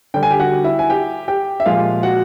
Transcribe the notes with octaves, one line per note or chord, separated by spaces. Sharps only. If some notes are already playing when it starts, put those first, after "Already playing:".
D3 G3 G5
G#5
G4 G5
F#4 F#5
E4 E5
G#5
G4 G5
G4 G5
E5
A#2 F3 G#3 F4 F5
F#4 F#5